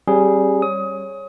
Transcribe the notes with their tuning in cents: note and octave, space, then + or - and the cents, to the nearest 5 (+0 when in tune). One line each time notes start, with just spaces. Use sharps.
G3 -10 C#4 -45 G#4 +0
C#5 -15 D#6 +25